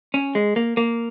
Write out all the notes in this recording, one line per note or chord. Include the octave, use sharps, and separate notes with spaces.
C#4
G#3
A#3
A#3